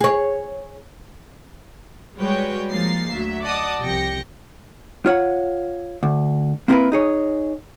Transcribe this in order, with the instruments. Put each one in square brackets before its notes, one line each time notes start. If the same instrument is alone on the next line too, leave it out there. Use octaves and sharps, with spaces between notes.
[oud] G#4 C#5
[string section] G3 G#3 F#4 B4 C#5 G5
F3 G#3 A#3 D#4 A6 C7
D2 F#3 E5
D5 D#5 F#5 A5 D6 D#6
C2 F3 G4 G5 A#6 C#7
[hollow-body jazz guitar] F4 C#5 F#5
D2
A#3 C4 E4 G#4 A#4 B4
D#4 G#4 C#5